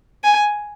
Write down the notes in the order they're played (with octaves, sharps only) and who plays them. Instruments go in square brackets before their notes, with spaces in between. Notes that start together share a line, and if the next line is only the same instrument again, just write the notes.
[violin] G#5